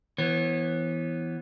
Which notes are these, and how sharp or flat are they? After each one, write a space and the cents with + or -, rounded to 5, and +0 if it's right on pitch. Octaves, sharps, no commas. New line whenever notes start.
E3 +0 B3 +0 C#5 -40